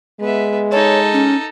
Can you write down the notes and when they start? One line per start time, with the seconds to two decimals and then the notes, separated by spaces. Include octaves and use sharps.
0.21 G#3 B3 E5
0.72 D#4 A4 C#5
1.13 C#4